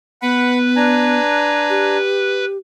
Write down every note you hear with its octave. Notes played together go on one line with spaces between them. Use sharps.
B3 B4 F#5 B5
D4 G#5 A#5
G4